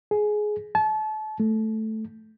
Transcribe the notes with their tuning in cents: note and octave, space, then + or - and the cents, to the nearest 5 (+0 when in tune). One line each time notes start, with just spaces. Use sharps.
G#4 +15
A5 -30
A3 -5